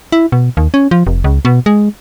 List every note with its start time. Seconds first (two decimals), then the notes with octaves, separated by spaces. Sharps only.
0.12 E4
0.32 B2
0.57 D#2
0.74 C#4
0.91 F3
1.07 F1
1.24 C#2
1.45 B2
1.66 G#3